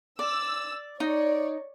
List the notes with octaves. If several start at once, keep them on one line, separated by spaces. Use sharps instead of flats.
D5 E6
D#4 C#5 D5